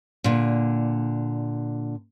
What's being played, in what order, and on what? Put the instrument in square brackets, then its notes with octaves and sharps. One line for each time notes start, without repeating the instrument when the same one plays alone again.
[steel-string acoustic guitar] A#2 D3